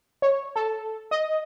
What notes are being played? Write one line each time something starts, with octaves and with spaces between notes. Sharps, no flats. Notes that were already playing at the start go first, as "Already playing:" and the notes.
C#5
A4
D#5